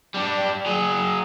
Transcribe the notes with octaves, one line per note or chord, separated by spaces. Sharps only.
G3 D4
F#3 G#4